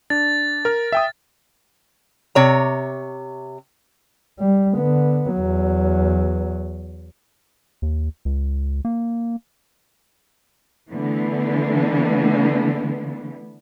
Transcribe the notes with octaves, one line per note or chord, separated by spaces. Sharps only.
D4 A6
A#4 F6
E5 G5 D#6
C3 C#5 A#5
G3
D3 B3
E2 F#3
D#2
C#2
A#3
D3 E3 A3 B3